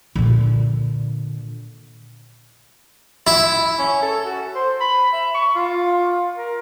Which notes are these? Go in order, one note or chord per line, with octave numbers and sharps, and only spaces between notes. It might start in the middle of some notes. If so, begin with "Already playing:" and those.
A#2 D3
E4
C#4
A4
F#4
C5
B5
E5
C#6
F4
A#4